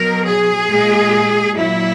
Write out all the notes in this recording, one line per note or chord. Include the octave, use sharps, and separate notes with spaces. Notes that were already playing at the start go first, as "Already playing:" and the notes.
Already playing: B2 F#3 A#4
G#4
A#2 G#3
A#2 F#3 E4